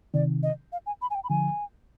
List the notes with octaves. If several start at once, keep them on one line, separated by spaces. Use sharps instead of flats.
C3 D#3 D5
D#5
F5
G#5
B5
G#5
G5
B5
D3 F3 G#5